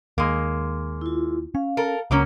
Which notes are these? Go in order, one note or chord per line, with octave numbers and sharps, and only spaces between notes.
D#2 G#3 A#3
E4 F4
C#4 F5
A4 A#4
C#2 C#3 F#3 A#3 C#4